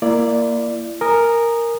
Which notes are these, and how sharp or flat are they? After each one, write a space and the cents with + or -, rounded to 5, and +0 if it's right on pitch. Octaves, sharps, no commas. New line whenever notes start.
A#3 +0 E4 +30 D5 +0
A#4 +0 G#5 +0 D#6 -20